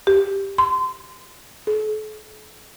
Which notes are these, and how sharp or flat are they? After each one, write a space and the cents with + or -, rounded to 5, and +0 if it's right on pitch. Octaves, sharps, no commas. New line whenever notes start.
G4 +5
C6 -25
A4 -40